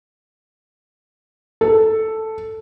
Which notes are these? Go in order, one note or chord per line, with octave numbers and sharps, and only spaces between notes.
A4